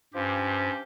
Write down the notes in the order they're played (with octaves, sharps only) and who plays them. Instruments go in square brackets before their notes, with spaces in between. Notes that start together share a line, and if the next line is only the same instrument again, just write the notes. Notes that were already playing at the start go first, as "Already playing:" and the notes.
[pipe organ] G2 [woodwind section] F3 C#4 G4